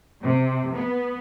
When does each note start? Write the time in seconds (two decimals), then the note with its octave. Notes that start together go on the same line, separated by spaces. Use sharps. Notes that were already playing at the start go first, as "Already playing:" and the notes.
0.23 C3
0.74 B3